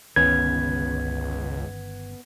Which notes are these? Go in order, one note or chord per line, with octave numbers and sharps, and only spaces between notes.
G1 C#2 D#3 B3 C#4 B4 G#6